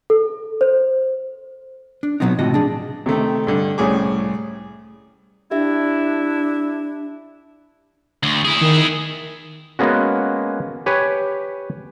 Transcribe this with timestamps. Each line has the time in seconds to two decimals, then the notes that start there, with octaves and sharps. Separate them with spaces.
0.10 A4
0.61 C5
2.03 D4
2.20 B2 D3 F#3 B3 C4 D#4
2.39 C#2 A2 C3 F3 F#4 D#5
2.54 D4 G#4
3.06 C3 D#3 A3
3.47 G2 D3
3.78 C2 A2 C#4 G#4 D6
5.51 D4 E4 G4 E5
8.23 D2
8.45 E4 G#4
8.61 D#3
9.79 G#3 A#3 B3 C#4 F#4
10.86 G4 B4 C#5 G#5